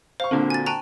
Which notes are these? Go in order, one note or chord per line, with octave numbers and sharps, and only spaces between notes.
C5 F5 C#6
A#2 D3 A#3 C4 D4 F#4
G#5 A6
G5 A5 A#5 C#6 F#6 D#7